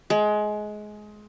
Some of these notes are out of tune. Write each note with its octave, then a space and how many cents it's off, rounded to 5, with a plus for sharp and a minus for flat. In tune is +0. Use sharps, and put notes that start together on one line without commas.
G#3 +20